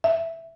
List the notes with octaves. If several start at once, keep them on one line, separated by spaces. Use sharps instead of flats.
E5